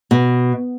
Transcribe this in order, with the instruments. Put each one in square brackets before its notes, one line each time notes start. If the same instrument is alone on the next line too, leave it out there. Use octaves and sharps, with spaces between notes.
[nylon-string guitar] B2